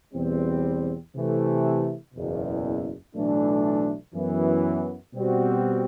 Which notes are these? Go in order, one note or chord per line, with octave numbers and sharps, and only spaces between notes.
E2 B2 G3 C4
C3 E3 A3
F#1 E2 B2
B1 A2 E3 A3 D4
F#2 E3 B3
B2 G3 C4 F#4